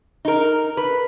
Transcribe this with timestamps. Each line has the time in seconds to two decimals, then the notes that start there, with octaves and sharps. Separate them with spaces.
0.25 D#4 A#4
0.77 B4